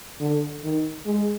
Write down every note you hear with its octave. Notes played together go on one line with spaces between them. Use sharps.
D3
D#3
G#3